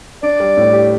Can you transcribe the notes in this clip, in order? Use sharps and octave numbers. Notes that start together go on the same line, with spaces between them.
D4 D5
G3
A2
G4